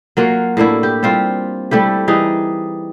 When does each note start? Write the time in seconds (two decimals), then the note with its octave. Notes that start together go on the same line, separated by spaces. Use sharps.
0.17 F#3 A#3 F4 F#4
0.57 A2 A#3 D4 E4
0.83 G4
1.03 G3 C4 F4
1.71 G3 A3 E4 G4
2.08 E3 G3 D#4 G#4